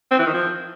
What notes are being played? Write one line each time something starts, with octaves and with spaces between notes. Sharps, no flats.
C4
E3
D#3
F3